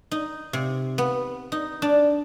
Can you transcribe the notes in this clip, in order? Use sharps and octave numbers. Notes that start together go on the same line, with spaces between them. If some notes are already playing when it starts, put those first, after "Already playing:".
D#4
C3
B3
D#4
D4